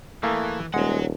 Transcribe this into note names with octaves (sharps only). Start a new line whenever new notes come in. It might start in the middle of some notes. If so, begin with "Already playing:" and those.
E3 A3 A#3 G#4
D#1 G#3 C#5 F#5